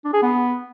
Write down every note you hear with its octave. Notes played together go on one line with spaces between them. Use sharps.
D4
G#4
B3